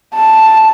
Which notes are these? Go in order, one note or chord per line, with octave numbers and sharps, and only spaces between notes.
A5